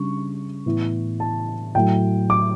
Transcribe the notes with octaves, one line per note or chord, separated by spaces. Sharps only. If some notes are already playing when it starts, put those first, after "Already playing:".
Already playing: C#3 G3 D4 C#6
A2 E3 B3 E4
A5
A2 F#3 A3 G5
D6